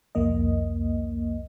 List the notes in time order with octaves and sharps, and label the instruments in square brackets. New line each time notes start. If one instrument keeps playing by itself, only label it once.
[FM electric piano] C2 F2 A#3 D#5